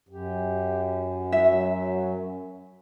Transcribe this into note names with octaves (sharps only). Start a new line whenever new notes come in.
F#2 G4
F#3 E5